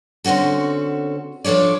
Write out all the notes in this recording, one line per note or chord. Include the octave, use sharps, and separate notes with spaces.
D3 C4 C#4 F#4 A4
F3 D4 A4 C#5 D5